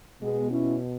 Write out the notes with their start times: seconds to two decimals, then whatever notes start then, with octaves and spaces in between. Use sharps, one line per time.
0.22 B2 G#3 B3
0.51 C#4 E4